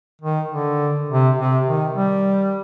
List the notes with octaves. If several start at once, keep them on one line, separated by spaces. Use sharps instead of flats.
D#3
D3
C3
C3
D#3
G3